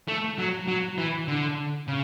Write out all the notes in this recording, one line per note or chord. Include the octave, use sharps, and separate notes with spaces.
A3
F#3
F#3
E3
D3
C#3